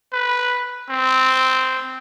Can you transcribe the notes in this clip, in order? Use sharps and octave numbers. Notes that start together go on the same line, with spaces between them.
B4
C4